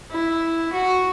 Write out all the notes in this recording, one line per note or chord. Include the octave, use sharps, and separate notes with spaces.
E4
F#4